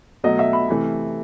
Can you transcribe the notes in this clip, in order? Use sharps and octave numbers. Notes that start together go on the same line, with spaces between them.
B2 F#3 A3 D#5
E5
B5
C3 E3 A3